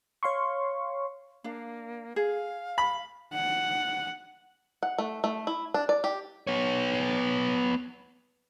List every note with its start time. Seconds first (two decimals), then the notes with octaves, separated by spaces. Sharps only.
0.23 C#5 F5 C6 C#6
1.44 A#3 D4 F5
2.16 G#4 F5
2.78 B5
3.33 F#5
4.83 F#5
4.98 A3
5.24 A3
5.47 E4
5.74 D4
5.89 D5
6.04 G4
6.47 B3 C#5